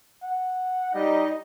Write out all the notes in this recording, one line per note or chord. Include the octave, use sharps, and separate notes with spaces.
F#5
G3 D#4 D#5